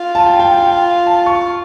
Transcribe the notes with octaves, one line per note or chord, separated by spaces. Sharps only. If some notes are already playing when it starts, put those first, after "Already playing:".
Already playing: F4
A5
G5
G5
G5
G5
A5
C#6